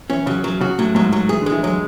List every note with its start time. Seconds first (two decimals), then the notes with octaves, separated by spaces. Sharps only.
0.10 E3 C#4
0.26 C#3 F#3
0.44 F#3
0.60 C#3 F#4
0.79 A2 F#3
0.95 G#2 F#3
1.13 F#3
1.29 E3 G#4
1.41 D3
1.46 G#3
1.52 E3
1.63 F#3 G#3